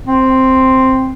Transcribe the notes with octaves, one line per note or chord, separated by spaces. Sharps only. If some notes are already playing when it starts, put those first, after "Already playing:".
C4